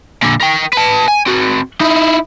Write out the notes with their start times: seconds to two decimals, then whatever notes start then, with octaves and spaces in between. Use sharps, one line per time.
0.23 A#2 D3
0.40 A#4 G5
0.73 B4 A5
1.08 G#5
1.26 C4 F#4
1.81 D#4 E4